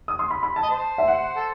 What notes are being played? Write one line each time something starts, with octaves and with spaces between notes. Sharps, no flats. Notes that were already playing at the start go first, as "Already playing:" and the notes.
D#6
C6
B5
B5
A5
D#5
C5
E5
F#5
A4